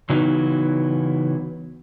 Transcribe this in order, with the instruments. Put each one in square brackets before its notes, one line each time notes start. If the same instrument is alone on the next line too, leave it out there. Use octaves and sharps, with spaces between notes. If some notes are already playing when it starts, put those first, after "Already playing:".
[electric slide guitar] C#3 E3 F#3 B3 D#4